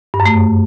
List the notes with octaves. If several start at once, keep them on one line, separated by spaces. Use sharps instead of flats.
G2
F#2
A3